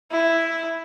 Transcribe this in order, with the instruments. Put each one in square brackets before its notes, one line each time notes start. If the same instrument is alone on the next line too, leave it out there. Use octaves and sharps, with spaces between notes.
[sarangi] E4